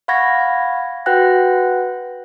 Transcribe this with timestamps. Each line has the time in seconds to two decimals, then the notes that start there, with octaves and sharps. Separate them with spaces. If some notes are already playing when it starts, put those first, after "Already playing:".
0.08 F5 F#5 B5 C#6 G#6 A#6
1.06 F#4 B4 F#5 G5 F#6 A#6